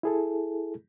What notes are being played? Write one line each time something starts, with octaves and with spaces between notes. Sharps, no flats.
E4 G#4 A4